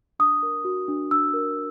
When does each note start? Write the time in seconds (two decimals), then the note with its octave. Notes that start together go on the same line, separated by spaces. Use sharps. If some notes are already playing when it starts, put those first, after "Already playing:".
0.19 D4 D#6
0.43 A#4
0.65 F#4
0.88 D4
1.11 D4 E6
1.34 A#4